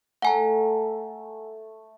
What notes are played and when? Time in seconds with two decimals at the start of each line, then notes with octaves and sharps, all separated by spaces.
0.22 A3 A4 F#5 G#5 A#5